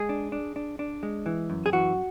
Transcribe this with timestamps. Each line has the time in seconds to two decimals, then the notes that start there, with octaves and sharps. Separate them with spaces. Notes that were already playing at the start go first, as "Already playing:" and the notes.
Already playing: G#3 G#4
0.09 D4
0.32 D4
0.56 D4
0.79 D4
1.03 G#3
1.26 E3
1.50 F#2
1.66 G#4
1.73 E3 F#4